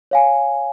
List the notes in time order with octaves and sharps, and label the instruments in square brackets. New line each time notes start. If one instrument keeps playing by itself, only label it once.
[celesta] C#5 F5 G#5